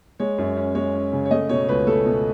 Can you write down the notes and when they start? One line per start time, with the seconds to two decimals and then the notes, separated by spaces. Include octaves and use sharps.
0.20 G#3 C#5
0.38 F#2
0.57 C#4
0.75 G#3 C#5
0.94 C#4
1.13 C#3
1.26 C#5
1.31 A3 D#5
1.49 B2 C#5
1.69 C#2 B4
1.87 A3 A4
2.06 B2